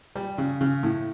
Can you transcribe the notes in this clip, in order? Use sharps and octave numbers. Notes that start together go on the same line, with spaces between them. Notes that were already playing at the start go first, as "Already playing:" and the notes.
G3
C#3
C#3
A2